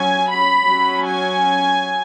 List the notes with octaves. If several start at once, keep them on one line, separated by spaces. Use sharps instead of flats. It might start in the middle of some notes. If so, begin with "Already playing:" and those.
Already playing: F#3 C#4 G#5
B5
F#3 C#4
G#5